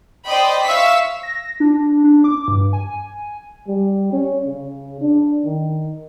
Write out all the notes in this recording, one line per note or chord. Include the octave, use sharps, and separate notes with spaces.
C5 D5 D#5 G5 B5
E5 F5 C#6 E6 B6
A#6
D4
D4
D6
G2
G#5
G3
C#4
C#3
D4
D#3